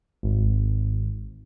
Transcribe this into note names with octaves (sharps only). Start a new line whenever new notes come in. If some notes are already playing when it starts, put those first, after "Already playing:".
G#1